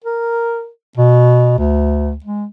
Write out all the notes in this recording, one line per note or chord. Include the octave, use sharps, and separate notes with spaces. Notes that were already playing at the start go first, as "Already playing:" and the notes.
A#4
B2
D2
G#3